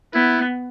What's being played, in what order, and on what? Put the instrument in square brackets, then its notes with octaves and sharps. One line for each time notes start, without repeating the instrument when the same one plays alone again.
[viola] B3 [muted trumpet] E4